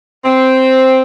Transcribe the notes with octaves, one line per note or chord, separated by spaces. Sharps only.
C4